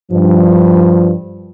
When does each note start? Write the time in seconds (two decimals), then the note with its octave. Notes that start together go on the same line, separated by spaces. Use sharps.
0.12 G2 F3